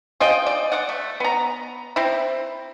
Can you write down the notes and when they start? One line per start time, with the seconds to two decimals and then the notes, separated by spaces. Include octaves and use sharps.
0.20 F4 G#4 D#5 G5
0.46 D5
0.72 D5 F#5
0.89 A3
1.20 B3 A#5
1.96 C4 E4